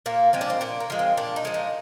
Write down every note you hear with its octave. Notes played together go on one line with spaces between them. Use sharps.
A#2 A#3
F3 G#3 C4
D4
C4
A#2 D4
A#3
F3 G#3
C4
A#2 D4
D#4
F3 G#3
D#4